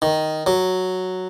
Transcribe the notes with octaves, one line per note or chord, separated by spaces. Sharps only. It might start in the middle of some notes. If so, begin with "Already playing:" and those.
D#3
F#3